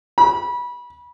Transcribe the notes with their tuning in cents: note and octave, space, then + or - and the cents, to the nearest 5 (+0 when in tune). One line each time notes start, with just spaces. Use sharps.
B5 -25